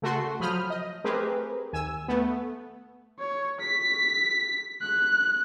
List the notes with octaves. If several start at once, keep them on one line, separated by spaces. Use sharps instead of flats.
C#3 A3 F#4 C6
F3 F#3 B5 D#6 F6 G6
D#5
A3 C4 G4 G#4 A#4 B4
D#2 G#5 E6
A3 B3
C#5
B6
F#6